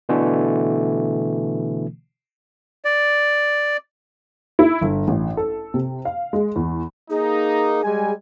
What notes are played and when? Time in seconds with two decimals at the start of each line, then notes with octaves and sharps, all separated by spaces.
0.09 B2 D3 E3 A3
2.85 D5
4.59 E4
4.81 G1
5.08 A1
5.37 A4
5.74 C3
6.05 F5
6.33 G#3
6.56 E2
7.10 A#3 D#4 G#4
7.83 G3 G#3 G#5